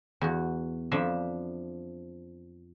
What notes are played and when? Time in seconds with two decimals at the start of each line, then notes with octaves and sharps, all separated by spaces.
0.21 E2 F#4
0.91 F2 F3 D4 E5 B5